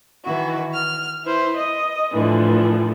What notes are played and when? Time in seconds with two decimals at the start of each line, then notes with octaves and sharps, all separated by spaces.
0.23 D#3 E3 E4 F#4
0.72 F6
1.24 E4 B4 C5
1.57 D#5
2.12 A2 D3 E3 F3